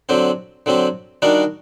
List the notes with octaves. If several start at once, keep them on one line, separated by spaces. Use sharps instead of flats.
D3 F#3 C4 G4
D3 F#3 C4 G4
D#3 G3 D4 F#4 A#4